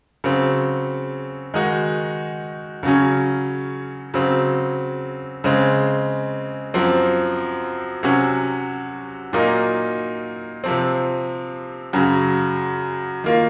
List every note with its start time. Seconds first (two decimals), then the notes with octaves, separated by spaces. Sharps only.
0.24 C#3 F#3 C4
1.54 D#3 G#3 D#4 F#4
2.83 C#3 F#3 C#4
4.14 C#3 F#3 C4
5.44 C#3 G#3 C4
6.74 F#2 F3 C4
8.03 C3 F#3 C#4 F#4
9.33 A#2 F#3 A#3 D#4
10.64 C3 F3 C4
11.93 F#2 C#3 F#3
13.24 D#3 A#3 F4